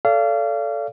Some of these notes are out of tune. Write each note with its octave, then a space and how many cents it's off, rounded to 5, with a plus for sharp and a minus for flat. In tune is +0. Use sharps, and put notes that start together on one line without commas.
A4 +0 D5 -35 F5 -30